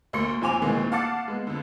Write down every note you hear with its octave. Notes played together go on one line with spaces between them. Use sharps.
D2 A#3 C6 C#7
F1 F3 C4 G#5 D6 F7
D2 A#2 D#3 E3 G#3 C4
F5 F#5 A5 D6 A6 C#7
G#3 B3
F2 D3